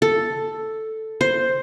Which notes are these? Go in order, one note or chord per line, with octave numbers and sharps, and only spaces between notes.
A4
C5